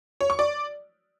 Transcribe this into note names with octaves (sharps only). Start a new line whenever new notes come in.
C#5
C#6
D5